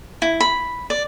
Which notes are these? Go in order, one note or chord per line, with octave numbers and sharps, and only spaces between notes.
E4
B5
D5